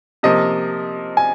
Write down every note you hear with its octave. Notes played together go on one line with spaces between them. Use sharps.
C3 F3 A#3 D#5
G#5